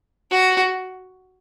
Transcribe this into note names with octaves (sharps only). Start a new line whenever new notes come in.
F#4